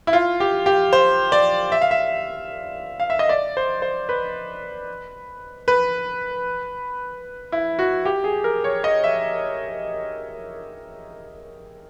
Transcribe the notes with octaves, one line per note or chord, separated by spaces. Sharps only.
E4
F4
G4
G4
C5
D5
E5
F5
E5
F5
E5
D#5
D5
C5
C5
B4
B4
E4
F#4
G4
G#4
A#4
C#5
D#5
E5